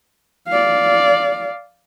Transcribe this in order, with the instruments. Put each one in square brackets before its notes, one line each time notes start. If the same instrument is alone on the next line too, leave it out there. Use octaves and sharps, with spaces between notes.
[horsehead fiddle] D5 F5